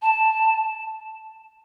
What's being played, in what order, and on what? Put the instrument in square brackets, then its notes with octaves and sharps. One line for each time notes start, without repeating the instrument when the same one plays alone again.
[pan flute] A5